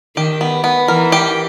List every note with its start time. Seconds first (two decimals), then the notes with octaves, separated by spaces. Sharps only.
0.16 D#3 G4
0.41 B3
0.64 B3
0.88 E3 A#4
1.12 G4